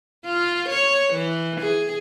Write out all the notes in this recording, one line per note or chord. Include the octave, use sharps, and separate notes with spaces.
F4
C#5
E3
G#4